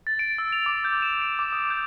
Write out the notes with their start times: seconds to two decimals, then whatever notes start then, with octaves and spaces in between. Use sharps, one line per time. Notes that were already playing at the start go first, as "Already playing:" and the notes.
0.07 A6
0.19 D7
0.38 E6
0.52 F7
0.66 D6
0.84 G6
1.02 E7
1.22 D7
1.39 D6
1.52 D#6
1.70 G6